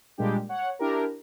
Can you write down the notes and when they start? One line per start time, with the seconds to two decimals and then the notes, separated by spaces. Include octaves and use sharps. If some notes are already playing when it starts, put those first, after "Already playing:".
0.18 A#2 G3 G#3 A#3 D4 G4
0.49 C#5 F#5
0.79 D4 E4 G4 A#4